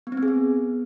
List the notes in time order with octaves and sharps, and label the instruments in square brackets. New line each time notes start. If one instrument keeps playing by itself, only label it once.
[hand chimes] B3
C4
B3
G#4
B3